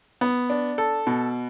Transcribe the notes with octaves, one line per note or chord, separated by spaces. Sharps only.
B3
D4
A4
B2